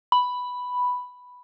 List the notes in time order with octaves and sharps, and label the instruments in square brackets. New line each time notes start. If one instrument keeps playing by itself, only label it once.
[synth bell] B5